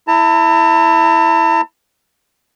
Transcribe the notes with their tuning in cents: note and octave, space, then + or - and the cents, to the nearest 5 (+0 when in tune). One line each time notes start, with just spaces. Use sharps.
E4 +0 A5 +45